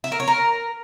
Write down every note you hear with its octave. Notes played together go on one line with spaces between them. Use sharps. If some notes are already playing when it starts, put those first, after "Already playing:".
E5
A#4
C#5
A#4